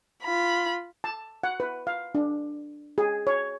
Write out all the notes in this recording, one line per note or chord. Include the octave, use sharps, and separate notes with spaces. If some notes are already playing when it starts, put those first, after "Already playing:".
F4 B5
A5
F#5
B4
F5
D4
G#4
C#5